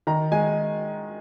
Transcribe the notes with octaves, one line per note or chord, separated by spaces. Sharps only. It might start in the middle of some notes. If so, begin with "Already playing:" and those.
D#3 A#5
G#3 G#5